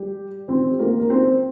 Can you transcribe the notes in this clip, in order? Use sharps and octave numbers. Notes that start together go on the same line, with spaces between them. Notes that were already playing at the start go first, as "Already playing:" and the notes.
Already playing: G3 G4
C4 C5
G4
A#3 A#4
A#4
C4 C5